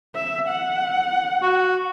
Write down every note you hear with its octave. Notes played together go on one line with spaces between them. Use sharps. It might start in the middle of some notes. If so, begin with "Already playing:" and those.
E5
F#5
F#4